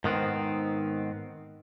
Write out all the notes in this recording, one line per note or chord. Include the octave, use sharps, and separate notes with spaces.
G#2 D#3 B3 C4